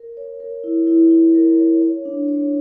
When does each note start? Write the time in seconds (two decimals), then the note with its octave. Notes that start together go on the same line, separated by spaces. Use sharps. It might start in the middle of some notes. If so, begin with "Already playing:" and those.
Already playing: A#4
0.17 C#5
0.40 A#4
0.64 E4
0.87 E4
1.11 E4
1.34 A#4
1.58 C#5
1.82 C#5
2.05 D4
2.28 C#5